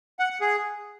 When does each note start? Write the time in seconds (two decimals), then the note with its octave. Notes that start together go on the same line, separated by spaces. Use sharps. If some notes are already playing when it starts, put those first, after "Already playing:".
0.19 F#5
0.30 F#5
0.41 G#4